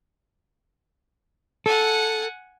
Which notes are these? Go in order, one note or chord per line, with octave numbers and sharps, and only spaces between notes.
A4 F#5 G#5